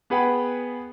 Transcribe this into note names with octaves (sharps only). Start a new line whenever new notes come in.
B3 G#4 B4 F#5 G5 B5